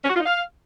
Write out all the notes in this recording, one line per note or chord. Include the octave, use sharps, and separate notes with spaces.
C#4
F#4
F4
D#4
F5